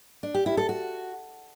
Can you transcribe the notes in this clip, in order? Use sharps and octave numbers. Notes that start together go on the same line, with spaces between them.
D4
G4
E4
A4
F#4